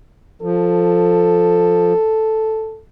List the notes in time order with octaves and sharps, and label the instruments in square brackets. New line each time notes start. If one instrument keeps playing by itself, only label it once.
[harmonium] F3 [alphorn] A4